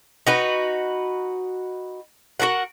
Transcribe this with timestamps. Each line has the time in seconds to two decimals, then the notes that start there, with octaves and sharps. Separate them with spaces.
0.27 D#4 F#4 B4
2.40 F#4 A4 A#4 F#5